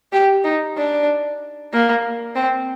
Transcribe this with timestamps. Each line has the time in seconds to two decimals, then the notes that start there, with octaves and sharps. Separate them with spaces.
0.12 G4
0.44 D#4
0.77 D4
1.72 A#3
2.35 C4